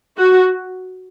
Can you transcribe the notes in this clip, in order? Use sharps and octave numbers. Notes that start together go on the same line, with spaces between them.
F#4